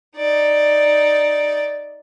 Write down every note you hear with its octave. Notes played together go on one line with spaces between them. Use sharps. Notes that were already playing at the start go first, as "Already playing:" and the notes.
D#4 D5